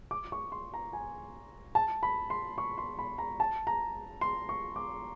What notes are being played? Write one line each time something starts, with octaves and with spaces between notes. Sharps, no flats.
D6
C#6
C6
A#5
G#5
A5
B5
C6
C#6
C6
B5
A#5
A5
A#5
C6
C#6
D6